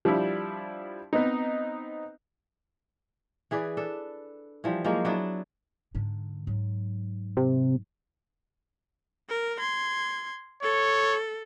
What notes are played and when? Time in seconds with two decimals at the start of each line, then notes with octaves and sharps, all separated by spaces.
0.05 F3 G3 D4 E4
1.13 B3 C4 D#4
3.51 E3 G#4 B4 D5
3.77 D4 A4
4.64 E3 F3 G3
4.85 F3 F#3 G#3 A#3
5.05 F#3 B3 D4 E4
5.95 G#2 D3
6.47 G#2 F#3
7.37 C3
9.29 A#4
9.60 C6 G#6
10.63 A4 C#5